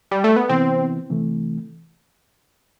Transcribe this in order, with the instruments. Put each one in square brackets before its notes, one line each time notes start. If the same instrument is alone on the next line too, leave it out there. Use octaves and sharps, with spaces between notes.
[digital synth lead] G3
A3
B3
[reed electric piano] C3 E3 B3 E4 [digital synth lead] C4
[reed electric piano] C3 E3 A3